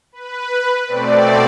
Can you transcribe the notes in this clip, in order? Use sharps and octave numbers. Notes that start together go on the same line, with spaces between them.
B4
B2 A3 C4 D5